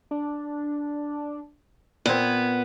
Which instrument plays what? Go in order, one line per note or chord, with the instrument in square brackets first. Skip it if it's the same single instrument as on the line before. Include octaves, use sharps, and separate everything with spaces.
[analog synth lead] D4
[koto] A#2 C4 [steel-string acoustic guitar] B3 [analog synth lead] G#6